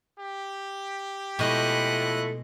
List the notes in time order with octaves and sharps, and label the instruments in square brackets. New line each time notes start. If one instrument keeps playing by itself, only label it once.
[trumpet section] G4
[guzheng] B2 G#3 [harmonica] F3 A3 E4 [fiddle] D#5 F#6